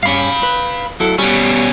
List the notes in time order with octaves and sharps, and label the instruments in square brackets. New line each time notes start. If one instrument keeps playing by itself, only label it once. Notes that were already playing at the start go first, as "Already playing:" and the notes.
[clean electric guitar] G2 C#4 [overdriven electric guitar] F5 B5
[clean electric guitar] B4
F#3 E4 A4
[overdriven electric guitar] B2 C#4 [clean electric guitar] G3